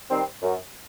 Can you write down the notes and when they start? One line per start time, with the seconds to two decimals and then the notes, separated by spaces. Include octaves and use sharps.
0.09 D#3 G3 C4
0.42 F#2